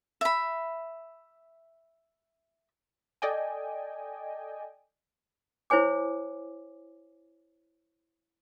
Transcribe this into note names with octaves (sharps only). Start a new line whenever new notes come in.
E5 B5
A4 D5 D#5 G5 G#5
E4 C5 C#5 G#5 D6